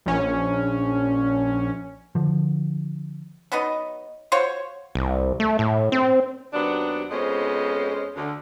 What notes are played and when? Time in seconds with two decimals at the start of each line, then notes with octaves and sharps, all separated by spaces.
0.06 A#1 C#4
2.15 D3 F3
3.52 F#3 B3 D#4 D#5
4.32 F4 F#4 C5 C#5
4.95 C2
5.40 A3
5.59 A2
5.92 C4
6.53 D#2 C3 F#3 B3 D4
7.10 F2 G#3 B3 C#4 C5 D#5
8.15 D2 D3